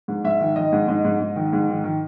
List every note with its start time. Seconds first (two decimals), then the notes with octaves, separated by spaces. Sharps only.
0.08 G#2
0.24 G#2 E5
0.40 D#3
0.56 D#3 D#5
0.72 G#2
0.88 G#2 D#5
1.05 G#2
1.20 G#2
1.36 D#3
1.53 G#2
1.69 D#3
1.84 D#3